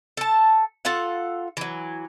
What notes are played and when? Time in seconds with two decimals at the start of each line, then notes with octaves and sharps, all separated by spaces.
0.17 A4 A5
0.85 F4 A4 F5 F#5
1.57 E3 F#3